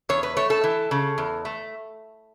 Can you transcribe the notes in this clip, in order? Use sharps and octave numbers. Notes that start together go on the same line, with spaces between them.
E2 C#5
B4
A3 C#5
A4
E3
C#3
E2
A3